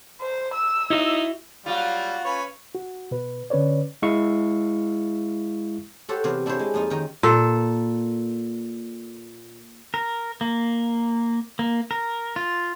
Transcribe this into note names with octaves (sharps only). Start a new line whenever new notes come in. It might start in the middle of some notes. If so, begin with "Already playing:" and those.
C5
E6
D#4 E4 F#4 E5
F#3 G3 A#3 F4 F#4
C#4 B4 C#5
F#4
B2 B4
D3 C#4 B4 C#5 D5
G#3 E4 F5 C#6
F#4 G4 A4 C5 C#5
C3 E3 B3 C4 C5 F5
D4 E4 G4 G#4 C5 C#5
G#3
F2 A#3 D#4 F4
D#3 C#4 D#4 G5 A#5
A#2 A4
A#4
A#3
A#3
A#4
F4